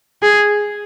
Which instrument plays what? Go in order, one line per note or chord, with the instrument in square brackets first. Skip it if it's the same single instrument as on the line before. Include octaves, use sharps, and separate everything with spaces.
[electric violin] G#4